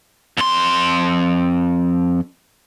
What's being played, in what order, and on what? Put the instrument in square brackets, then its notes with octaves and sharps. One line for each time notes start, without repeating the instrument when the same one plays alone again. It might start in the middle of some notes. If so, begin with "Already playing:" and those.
[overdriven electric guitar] F2 C6